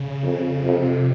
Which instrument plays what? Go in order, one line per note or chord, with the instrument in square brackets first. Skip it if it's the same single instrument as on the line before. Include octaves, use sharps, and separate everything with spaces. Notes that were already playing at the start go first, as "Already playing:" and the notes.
Already playing: [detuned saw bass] C#3
[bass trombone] F2
[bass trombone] F2 [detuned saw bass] C3
[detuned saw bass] C#3
C3